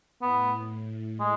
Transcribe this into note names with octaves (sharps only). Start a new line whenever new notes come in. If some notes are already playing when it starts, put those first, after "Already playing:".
A2 B3
G#3